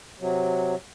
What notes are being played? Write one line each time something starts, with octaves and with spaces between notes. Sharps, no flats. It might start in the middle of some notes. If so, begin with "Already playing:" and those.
C3 F#3